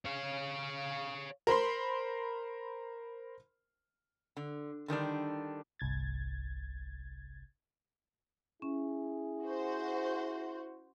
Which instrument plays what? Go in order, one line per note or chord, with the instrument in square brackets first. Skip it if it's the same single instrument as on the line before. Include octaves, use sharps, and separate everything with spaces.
[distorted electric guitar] C#5 F5
[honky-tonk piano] A#4 C5 B5 C6
[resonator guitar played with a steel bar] D3
D3 D#3 G3 D4
[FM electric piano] G1 C2 G#6 A6
[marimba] C#4 [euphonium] E4 [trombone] G#4
[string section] F#4 C5